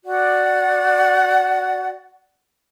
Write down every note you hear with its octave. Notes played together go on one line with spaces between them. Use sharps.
F#4 D5 F#5